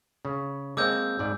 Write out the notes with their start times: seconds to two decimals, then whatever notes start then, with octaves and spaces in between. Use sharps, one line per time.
0.25 C#3
0.77 G#3 A#3 C4 D6 E6 G6
1.19 G#2 D5